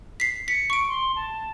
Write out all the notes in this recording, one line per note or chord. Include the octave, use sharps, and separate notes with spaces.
B6 C7
B6 C#7
C#6 D7
C6
A5